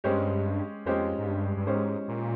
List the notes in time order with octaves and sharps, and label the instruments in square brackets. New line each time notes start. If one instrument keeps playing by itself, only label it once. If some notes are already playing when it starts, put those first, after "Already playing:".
[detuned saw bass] G2 [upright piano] G#3 C#4 G4 C5
[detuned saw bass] F2 [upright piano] G#3 C#4 G4 C5
[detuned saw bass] G#2
G2
G2
[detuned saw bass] G#2 [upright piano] G#3 C#4 G4 C5
[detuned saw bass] A#2